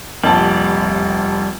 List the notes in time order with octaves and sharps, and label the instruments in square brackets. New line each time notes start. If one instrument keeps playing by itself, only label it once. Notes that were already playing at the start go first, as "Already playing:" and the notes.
[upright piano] F1 A#1 A5 [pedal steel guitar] G3